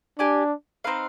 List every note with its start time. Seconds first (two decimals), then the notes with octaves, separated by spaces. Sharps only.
0.19 D4 G4 D5 G#5
0.84 C4 D#4 B4 F5